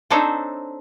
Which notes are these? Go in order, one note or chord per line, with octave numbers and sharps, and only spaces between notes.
C4 D4 D#4 A4 C5 C#5